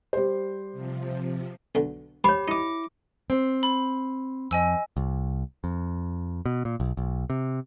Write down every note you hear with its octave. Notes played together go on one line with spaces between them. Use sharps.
G3 C5
C3 F3
B1 D3
G4 C5 C#5 B5 C#6 D6
D#4 E4 D#5 D6
C4
B5
F2 D#5 G#5 E6
C2
F2
B2
A#2
B1
B1
C3